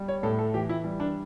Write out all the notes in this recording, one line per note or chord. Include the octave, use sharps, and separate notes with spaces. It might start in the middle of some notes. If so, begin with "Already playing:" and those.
Already playing: G3
C#5
A2 A4
A4
E3 G4
E4
G3
D4